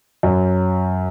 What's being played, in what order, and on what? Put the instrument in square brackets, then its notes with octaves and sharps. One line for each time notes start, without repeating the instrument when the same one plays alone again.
[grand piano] F#2